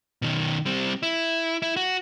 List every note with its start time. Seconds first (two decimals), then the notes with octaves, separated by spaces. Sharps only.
0.22 B2 D#3
0.66 G3 C4
1.03 E4
1.62 E4
1.77 F#4